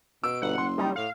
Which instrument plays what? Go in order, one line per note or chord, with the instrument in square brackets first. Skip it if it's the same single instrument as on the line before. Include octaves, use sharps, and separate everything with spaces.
[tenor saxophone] B2 [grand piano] E6 [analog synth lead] D7
[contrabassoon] G1 [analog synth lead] F#5
[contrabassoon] F#1 [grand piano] C6
[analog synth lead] G3 [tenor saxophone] D#4
[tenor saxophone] A2 [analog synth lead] F5